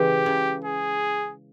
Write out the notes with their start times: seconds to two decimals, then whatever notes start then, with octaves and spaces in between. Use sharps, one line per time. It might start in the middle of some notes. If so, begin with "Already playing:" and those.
Already playing: C#3 E3 G#3 G4
0.26 C#3
0.64 G#4